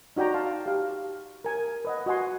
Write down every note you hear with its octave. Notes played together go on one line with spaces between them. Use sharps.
D#4 F#4 D5 G5 A#5
F5 A5 C6
G4 F5
A#4 G#5
B4 D#5 F#5
F#4 D#5 F#5 G#5 C6